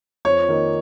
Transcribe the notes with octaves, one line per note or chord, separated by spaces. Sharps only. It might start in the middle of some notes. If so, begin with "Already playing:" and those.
F2 C#5
D#3 A#3 D#4